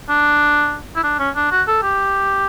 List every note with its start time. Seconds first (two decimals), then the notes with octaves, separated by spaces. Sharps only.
0.10 D4
0.96 E4
1.03 D4
1.19 C#4
1.36 D4
1.51 F#4
1.68 A4
1.83 G4